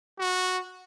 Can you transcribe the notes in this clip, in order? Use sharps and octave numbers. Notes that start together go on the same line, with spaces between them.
F#4